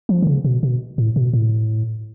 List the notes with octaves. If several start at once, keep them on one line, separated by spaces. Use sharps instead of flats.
F3
D3
C#3
B2
B2
A2
B2
A2